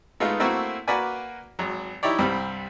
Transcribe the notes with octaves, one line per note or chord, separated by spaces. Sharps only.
G#3 A3 B3 D#4 F4
A3 A#3 C4 E4 F#4
A#3 F#4 A#4 B4 D5 G#5
G#1 F#3
D#4 E4 G4 C#5 D5
C2 G2 G3 C4